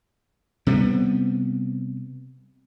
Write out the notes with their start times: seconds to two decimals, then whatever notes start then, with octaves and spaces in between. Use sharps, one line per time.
0.67 C3 G3 A3 B3